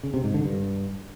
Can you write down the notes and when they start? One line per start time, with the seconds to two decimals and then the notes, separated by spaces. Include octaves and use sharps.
0.03 C#3
0.14 C3
0.24 G#2
0.34 D3
0.45 G2